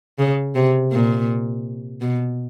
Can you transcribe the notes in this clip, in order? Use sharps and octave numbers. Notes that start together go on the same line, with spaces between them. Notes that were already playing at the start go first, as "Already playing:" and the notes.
C#3
C3
A#2
B2